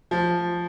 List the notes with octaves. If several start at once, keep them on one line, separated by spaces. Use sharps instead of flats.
F3